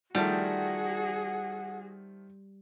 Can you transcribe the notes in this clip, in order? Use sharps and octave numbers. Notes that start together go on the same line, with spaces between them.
D#3 F3 G3 A3 F#4 G#4 F#5